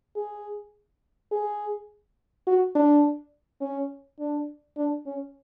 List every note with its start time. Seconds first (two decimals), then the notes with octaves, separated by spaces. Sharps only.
0.16 G#4
1.32 G#4
2.47 F#4
2.75 D4
3.61 C#4
4.19 D4
4.77 D4
5.06 C#4